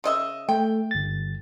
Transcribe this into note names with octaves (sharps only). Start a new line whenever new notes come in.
C#3 D#5 E5
A3 G5
G1 A6